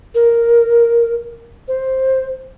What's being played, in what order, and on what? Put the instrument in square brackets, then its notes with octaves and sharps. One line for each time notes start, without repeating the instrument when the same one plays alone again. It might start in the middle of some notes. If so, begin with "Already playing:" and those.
[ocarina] A#4
C5